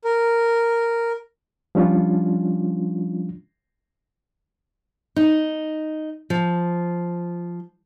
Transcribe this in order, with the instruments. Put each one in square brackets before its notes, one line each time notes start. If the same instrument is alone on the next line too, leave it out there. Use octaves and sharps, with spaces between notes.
[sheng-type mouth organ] A#4
[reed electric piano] F3 G3 C#4 D4 F4
[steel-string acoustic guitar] D#4
F3